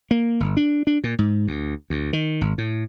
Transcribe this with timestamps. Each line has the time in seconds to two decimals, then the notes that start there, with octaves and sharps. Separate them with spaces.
0.11 A#3
0.40 G1
0.57 D4
0.87 D4
1.04 A#2
1.19 G#2
1.47 D2
1.90 D2
2.13 D#3
2.41 G#1
2.58 A2